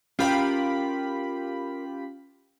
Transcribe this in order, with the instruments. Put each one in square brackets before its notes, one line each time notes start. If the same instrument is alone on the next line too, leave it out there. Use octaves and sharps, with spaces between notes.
[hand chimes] C#4 [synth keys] F4 G4 B5 [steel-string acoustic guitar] A#4 F5 G5